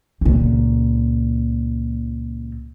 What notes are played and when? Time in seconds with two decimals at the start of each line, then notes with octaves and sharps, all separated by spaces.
0.21 C#2 A#2